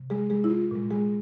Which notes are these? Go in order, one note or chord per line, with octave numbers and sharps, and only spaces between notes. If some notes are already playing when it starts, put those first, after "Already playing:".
Already playing: C3
G#3 G#4
G#3 G#4
E4
F4
A#2 G#3
G#3 G#4